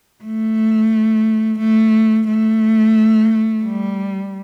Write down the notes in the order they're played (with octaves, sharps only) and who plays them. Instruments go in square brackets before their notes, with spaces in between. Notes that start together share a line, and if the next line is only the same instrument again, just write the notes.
[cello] A3
A3
A3
G3